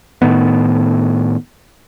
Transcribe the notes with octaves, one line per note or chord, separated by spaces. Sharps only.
A2 D#3 B3